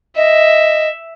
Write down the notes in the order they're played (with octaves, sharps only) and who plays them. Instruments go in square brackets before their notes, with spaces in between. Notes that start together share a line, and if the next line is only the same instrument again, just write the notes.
[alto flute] D#5 [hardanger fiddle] E5